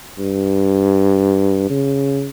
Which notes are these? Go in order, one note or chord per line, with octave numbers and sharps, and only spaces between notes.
G2
C#3